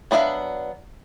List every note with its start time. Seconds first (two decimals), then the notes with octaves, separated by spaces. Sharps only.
0.11 F#3 B3 D4 E5 F5